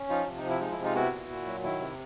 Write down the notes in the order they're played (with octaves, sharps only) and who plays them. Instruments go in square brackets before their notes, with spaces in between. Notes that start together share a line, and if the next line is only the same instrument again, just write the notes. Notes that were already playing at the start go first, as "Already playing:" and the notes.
Already playing: [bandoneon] C#4
F3 D#4 F4
C3
D#4
F3
E4
G#3 D#4
E4
C3
D#4 F4
B3 E4 F#4
A#2
A#2
F#3
D#3 E4
C3